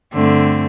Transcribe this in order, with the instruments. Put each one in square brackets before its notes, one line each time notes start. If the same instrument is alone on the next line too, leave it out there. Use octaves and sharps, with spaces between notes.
[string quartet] G2 D3 A3 C4